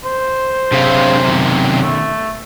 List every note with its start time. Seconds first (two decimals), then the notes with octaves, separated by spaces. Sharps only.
0.05 C5
0.72 F#2 C3 D4 G#4 F5
1.27 B2 D#3
1.82 A3